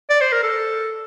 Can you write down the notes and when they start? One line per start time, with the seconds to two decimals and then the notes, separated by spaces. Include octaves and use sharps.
0.10 D5
0.21 C5
0.32 A#4
0.43 A4